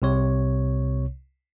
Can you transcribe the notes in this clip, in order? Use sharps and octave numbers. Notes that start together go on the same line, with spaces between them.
C2 C3 C#5